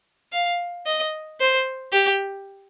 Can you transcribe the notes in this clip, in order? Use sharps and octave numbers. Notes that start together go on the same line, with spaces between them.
F5
D#5
C5
G4